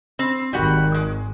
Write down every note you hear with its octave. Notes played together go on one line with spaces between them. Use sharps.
C4
G#1 D#3 G3 F#4 F#5
G#3